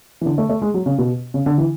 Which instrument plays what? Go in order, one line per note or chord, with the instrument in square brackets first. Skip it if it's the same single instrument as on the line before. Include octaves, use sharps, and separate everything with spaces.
[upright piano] E3
D3
A3
A3
G#3
F#3
C#3
B2
C#3
D3
E3